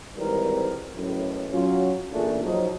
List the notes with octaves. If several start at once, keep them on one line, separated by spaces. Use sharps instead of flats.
G#1 G#2 E3 G3 C4 A#4
B1 F#2 A2
F#3 C#4 F4
A1 E2 A#2 A3 D4 G#4
F3 F#3 D#4